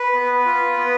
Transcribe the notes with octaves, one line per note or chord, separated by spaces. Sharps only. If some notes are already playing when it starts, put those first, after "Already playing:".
Already playing: B4
B3
F4
B3